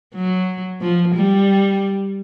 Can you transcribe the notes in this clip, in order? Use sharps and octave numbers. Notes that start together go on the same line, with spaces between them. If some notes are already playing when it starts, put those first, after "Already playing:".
F#3
F3
G3